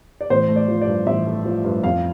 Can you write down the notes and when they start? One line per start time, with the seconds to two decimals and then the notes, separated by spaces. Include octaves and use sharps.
0.21 D5
0.30 A1 C5
0.49 A3
0.56 D5
0.68 F3
0.81 D5
0.87 G2
1.07 A1 E5
1.27 A3
1.45 F3
1.64 G2
1.83 F2 F5